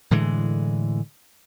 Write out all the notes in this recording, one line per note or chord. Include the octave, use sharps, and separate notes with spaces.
A2 D3 E3 G#3